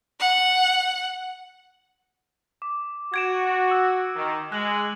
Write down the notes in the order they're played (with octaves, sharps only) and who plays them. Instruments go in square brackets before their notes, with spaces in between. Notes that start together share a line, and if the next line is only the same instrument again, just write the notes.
[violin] F#5
[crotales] D6
[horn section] F#4 [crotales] G#6 D7 E7
[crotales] E6
[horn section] D#3
[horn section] G#3 [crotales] F#6 F#7